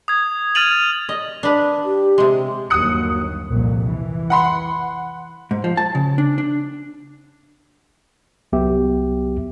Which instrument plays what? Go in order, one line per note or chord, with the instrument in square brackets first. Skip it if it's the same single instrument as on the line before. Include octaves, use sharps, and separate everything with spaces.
[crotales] D#6 G#6
F6 G#6 A6 D#7 F7 F#7
[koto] D#5
D4 B4
[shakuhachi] G4
[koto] C3 G#3
[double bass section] G1 D#2 F#3 [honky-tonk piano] D#6 F#6 C#7
[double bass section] C2 F2 A#2
E3
[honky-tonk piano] F#5 B5 C6
[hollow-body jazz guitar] G#2
F3
A5
C#3
D4
D4
[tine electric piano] C2 F#3 B3 G4 E5